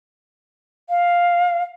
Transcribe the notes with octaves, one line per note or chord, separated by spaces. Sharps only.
F5